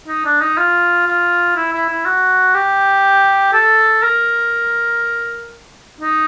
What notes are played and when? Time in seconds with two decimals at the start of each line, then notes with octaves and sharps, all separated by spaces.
0.08 D#4
0.25 D4
0.41 D#4
0.57 F4
1.07 F4
1.56 E4
1.73 E4
1.89 E4
2.05 F#4
2.55 G4
3.53 A4
4.03 A#4
6.01 D#4